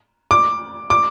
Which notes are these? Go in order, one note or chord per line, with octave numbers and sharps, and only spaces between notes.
D6
D6